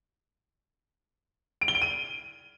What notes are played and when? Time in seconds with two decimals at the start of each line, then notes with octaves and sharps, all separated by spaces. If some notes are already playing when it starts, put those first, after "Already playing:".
1.61 D7
1.68 G7
1.75 D7
1.82 D#7